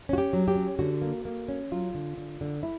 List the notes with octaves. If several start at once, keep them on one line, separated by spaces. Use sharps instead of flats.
C#4 F#4
G4
F#3
G4
C#4
D3 F#4
A#3
A#3
C#4
F#3 F4
D3
D3
D3
E4